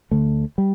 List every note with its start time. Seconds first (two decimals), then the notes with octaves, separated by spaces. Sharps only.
0.11 D2 D3 A3
0.58 G3